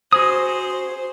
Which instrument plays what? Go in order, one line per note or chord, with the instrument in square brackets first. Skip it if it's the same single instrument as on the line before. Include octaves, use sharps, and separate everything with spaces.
[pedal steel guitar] F#4 G#4 D#6 [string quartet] C5